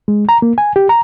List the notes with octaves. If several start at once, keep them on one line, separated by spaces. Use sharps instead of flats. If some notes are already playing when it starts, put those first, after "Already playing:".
G#3
A#5
A#3
G#5
G4
A#5